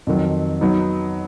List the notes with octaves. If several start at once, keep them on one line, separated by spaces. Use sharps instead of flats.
F2 D#3 F#3
F#3 B3 D#4